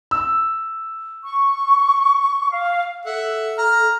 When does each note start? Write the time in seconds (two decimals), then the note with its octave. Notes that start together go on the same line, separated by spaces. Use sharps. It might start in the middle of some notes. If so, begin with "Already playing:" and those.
0.11 E6
1.23 C#6
2.51 F5
3.05 A4 E5 F#5
3.58 A#5 F6